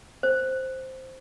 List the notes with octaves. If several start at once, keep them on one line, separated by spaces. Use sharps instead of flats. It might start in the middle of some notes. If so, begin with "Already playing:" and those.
C5